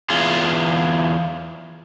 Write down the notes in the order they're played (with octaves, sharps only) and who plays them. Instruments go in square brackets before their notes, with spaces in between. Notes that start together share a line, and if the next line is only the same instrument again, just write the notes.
[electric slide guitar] E2 F4 G#4